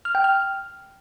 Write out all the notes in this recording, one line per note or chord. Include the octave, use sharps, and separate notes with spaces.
F6
G5
F6